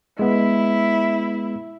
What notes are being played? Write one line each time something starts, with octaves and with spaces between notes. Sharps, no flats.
G#3 B3 E4